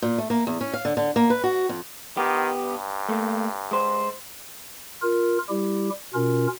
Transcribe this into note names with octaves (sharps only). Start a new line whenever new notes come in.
A#2
A3
A#3
E2
C#4
F5
D3
D3
A#3
B4
F#4
F2
D#3 B3 G4
G2
A3 A#3
G#3 C5
F4 A#4
G3 E4 G4
B2 C#4 F4 A#4